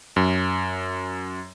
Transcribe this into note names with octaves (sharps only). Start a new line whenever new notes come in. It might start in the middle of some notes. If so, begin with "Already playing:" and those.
F#2